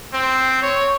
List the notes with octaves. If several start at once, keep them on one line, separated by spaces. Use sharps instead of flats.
C4
C#5